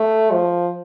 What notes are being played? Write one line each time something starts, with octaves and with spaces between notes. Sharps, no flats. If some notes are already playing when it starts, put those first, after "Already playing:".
Already playing: A3
F3